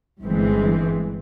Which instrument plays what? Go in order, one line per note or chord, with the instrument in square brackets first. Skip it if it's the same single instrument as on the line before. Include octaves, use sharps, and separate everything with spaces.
[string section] G1 G2 E3 G#3 C4